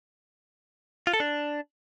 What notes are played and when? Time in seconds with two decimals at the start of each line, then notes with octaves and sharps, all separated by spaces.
1.07 F4
1.14 A4
1.20 D4